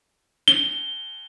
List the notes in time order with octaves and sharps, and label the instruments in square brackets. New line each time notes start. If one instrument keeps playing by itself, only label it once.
[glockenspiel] G7